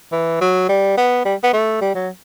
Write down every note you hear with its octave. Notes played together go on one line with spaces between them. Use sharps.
E3
F#3
G3
B3
G3
B3
A3
G3
F#3